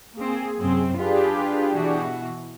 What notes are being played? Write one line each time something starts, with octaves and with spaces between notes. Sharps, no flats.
A#3 C4 G#4
F#2 C3 C4
D4 F4 G4 G#4 B4
B2 E3 F#4